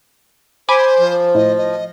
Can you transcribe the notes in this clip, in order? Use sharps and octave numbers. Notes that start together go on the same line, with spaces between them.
C5 G#5 B5 D6
F3
A2 D#5
D#5